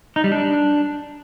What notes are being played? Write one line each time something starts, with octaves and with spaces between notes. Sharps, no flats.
D#4
G3
D4